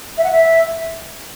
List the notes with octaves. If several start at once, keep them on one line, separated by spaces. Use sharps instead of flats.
E5
F#5
E5